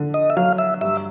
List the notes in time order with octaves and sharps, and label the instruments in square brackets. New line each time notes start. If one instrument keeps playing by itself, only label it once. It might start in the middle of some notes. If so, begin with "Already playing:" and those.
Already playing: [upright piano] D3
[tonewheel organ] D#5
E5
[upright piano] F#3 [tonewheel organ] F5
[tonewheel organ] E5
[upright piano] G2 [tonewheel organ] E5